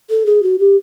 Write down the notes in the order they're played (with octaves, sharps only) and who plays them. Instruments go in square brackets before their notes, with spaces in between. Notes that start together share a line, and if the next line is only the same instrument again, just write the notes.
[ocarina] A4
G#4
F#4
G4